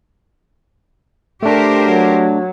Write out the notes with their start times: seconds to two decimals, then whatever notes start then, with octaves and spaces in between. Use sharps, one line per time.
1.43 A3 D4 G4 A#4 C5
1.85 F#3